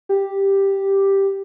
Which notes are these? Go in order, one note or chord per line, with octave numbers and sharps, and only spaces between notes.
G4